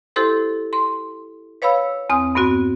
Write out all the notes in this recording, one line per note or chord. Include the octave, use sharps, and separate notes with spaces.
E4 G4 A4 C5 C6
C6
B4 C#5 F5 B5 E6
E2 C4 D#6 F6
G2 B3 C4 F#4